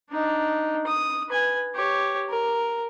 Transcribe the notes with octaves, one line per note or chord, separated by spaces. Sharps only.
D4 D#4
D#6
B4 G#5
G4 C#5
A#4